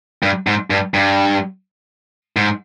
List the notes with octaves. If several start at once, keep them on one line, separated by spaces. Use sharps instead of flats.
G2
G#2
G2
G2
G#2